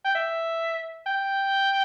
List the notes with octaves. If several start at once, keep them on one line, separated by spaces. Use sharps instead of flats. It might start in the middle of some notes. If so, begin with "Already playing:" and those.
G5
E5
G5